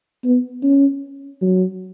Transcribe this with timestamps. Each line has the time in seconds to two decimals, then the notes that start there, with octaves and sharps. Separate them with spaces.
0.24 B3
0.63 C#4
1.41 F#3